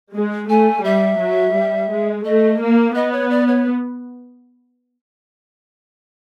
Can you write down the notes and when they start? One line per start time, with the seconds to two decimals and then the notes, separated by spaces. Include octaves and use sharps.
0.15 G#3
0.50 A3 G#5
0.84 G3 E5
1.19 F#3
1.55 G3
1.90 G#3
2.25 A3 D#5
2.59 A#3
2.95 B3 D#5
3.13 C#5
3.30 D5
3.48 C#5